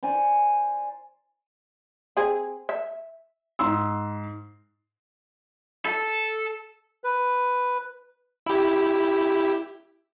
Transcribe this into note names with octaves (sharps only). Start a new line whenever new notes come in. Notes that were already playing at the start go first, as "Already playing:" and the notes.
C5 D5 G#5 A#5
C4 G#4
E5
G#2 C6 E6
A4
B4
E4 G4